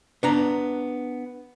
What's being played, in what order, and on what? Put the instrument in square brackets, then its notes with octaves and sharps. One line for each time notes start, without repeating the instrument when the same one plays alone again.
[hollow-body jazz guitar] B3 D4 A#5